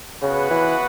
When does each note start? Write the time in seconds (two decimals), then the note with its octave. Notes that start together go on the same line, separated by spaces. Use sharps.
0.22 C#3 B3 F#4 B4 F#5
0.50 E3